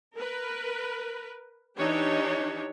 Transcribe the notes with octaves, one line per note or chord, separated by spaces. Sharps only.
A#4 B4
E3 D4 D#4 G4 C#5